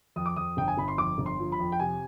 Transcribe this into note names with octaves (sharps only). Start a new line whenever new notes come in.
F2 D#6
D6
F2 D#6
G1 G5
G#5
G1 B5
C6
F2 D6
G1
C6
F3
B5
F2
G5
C3 G#5